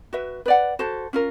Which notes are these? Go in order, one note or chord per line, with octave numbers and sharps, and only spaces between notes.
F#4 B4 E5
B4 D5 F#5
F#4 A4 C5
C#4 F4 A#4